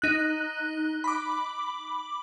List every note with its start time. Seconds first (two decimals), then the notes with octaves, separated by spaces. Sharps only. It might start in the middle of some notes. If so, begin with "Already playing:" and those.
0.02 D#4 F#6
1.04 B5 D6